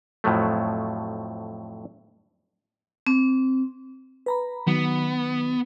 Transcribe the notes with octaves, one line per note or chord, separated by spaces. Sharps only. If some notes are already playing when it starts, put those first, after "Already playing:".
F2 A2 F3 F#3 A3
C4
B4 A#5 B5
D#3 F#3 B3